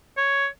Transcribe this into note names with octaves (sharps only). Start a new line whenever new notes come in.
C#5